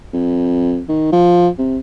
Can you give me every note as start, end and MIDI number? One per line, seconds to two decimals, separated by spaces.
0.13 0.81 41
0.89 1.10 51
1.12 1.48 53
1.58 1.78 48